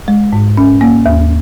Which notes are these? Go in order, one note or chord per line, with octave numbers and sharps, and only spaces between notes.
G#3
G#2
C#4
A#3
D#2